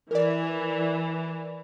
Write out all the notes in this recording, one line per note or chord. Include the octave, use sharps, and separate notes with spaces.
E3 A#4 D5